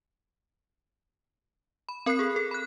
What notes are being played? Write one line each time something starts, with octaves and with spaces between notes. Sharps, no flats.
B5
C4 A#4 B5 F#6 C7
G#4 A4
A4
B5 F#6